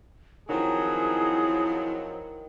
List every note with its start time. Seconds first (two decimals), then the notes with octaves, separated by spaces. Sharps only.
0.49 D#3 F3 F#3 C4 E4 G#4